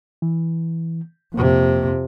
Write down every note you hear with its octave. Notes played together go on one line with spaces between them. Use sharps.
E3
F2 C3 A#3